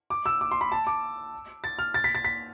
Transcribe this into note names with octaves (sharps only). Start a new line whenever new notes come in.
D6
E6
D6
C6
B5
A5
D6
A6
F6
A6
B6
A6
B6